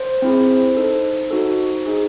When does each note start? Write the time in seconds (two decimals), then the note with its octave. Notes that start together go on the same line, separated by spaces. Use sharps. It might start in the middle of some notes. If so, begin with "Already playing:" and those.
Already playing: C5
0.22 C4 E4 G#4
0.77 D#4 A4
1.31 D#4 F#4 A4
1.86 D#4 G#4